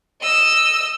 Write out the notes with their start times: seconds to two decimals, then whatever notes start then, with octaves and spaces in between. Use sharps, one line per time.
0.21 D#5 E6